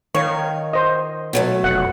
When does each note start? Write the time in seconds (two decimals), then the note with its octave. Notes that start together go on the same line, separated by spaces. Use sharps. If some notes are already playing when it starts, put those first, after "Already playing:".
0.15 D#3 C#5 F5 C#6
0.73 C5 D#5
1.33 B2 F#3 A3
1.64 F1 F#5